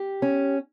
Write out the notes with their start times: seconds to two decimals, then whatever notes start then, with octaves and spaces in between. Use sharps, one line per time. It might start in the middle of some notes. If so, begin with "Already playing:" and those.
Already playing: G4
0.22 C#4